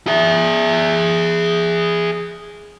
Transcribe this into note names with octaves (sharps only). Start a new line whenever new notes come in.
G#4 E5